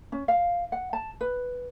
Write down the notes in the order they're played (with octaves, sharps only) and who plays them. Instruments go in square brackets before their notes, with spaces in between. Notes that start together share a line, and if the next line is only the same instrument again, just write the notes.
[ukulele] C#4
F5
F#5
A5
B4